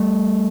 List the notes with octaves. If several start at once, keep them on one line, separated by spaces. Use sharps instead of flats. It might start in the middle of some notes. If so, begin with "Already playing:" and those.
Already playing: G3 A3